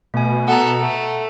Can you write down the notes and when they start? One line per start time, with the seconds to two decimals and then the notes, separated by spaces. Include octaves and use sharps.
0.14 B2 A3 G#5
0.48 B3 A4 F#5 A#5
0.80 A3